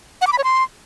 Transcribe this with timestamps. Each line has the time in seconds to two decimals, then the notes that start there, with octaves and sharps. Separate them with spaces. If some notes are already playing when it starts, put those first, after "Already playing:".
0.21 F#5
0.27 D6
0.33 B5
0.38 C#5
0.44 C6